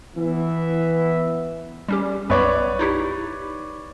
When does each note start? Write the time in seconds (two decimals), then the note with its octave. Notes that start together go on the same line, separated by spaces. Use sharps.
0.16 E3 B3 E5
1.88 G3 C#4 G4
2.30 B1 F#2 B3 B4 C#5 D5
2.79 D#4 E4 G4